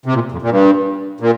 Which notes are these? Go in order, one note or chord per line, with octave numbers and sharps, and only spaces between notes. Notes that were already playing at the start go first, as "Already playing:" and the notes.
C3
A#2
F2
A#2
G2
A#2